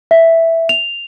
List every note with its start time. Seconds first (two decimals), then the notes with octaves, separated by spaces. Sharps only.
0.11 E5
0.69 F7